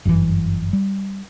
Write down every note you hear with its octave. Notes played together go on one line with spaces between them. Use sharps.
G1 F#2 C3 E3
G3